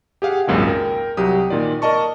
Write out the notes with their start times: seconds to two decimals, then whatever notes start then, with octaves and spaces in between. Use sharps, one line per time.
0.22 G4 G#4 F5 F#5
0.47 G#1 C#2 F#2 A#2 G#3
0.67 A#4 G5
1.17 C2 F#3 G4 D#6
1.50 A#2 D#3 F4 D5
1.82 A#4 D5 D#5 A5 C#6